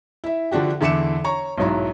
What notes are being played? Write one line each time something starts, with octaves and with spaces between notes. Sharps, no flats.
E4 E5
D3 F3 D4 F#4 G4
E2 D3 E5 D6 C#7 E7
C#5 A#5 C#6
B1 G#2 F#3 E4 A#5